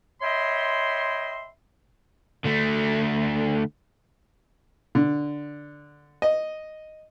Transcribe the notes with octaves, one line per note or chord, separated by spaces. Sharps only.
C#5 D#5 E5 G5 B5 C6
D3 A3
D3
D#5